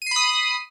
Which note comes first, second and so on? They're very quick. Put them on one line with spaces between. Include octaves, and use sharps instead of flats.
D#7 C7 B5 D#6